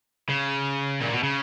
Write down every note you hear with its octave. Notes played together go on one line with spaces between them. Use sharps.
C#3
A#2
B2
C#3